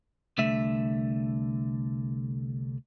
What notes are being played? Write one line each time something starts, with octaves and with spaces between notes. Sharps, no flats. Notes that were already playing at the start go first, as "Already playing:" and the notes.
C2 D3 A3 E5